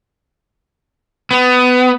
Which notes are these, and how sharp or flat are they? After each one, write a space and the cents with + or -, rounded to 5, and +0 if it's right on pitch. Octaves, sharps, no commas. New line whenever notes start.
B3 +20